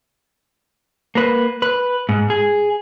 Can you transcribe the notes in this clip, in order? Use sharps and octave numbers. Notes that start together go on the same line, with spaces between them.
A#3 B4
B4
G#2
G#4